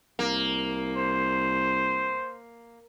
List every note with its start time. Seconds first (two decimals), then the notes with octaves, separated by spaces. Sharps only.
0.19 C2 A#3
0.97 C5